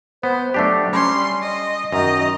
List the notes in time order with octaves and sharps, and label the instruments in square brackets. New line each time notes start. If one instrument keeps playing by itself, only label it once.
[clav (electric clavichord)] B3 [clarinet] C5
[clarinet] F#3 [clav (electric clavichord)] A3 D4 G4
[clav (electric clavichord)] G3 C#5 [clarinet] C#4 [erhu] C6
[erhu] D#5
[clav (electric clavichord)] F#2 D#3 [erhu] D#5 [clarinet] A#5